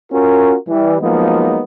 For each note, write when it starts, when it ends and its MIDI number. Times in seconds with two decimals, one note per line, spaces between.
0.13 0.56 61
0.13 0.56 65
0.13 0.56 66
0.13 0.56 70
0.68 0.97 52
0.68 0.97 55
1.01 1.63 53
1.01 1.63 54
1.01 1.63 56
1.01 1.63 58
1.01 1.63 59
1.01 1.63 63